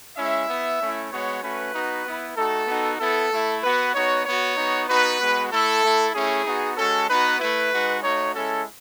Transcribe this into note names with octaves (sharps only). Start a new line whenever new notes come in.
G#3 C#4 E4 E5
B3 E4
A3 C#4 E4
G#3 B3 F#4 C#5
A3 C#4 F#4 B4
B3 D#4 F#4
B3 E4
A3 D#4 F#4 A4
B3 D#4 F#4
B3 E4 A4
A3 E4
B3 F#4 B4
B3 D#4 F#4 C#5
B3 F#4 C#5
B3 D#4 F#4
B3 D#4 F#4 B4
G#3 B3 F#4
A3 E4 A4
A3 E4
A3 C#4 E4 G#4
B3 D#4 F#4
G#3 C#4 F#4 A4
B3 D#4 F#4 B4
A3 E4 B4
G#3 D#4 F#4
A3 D#4 F#4 C#5
G#3 C#4 E4 A4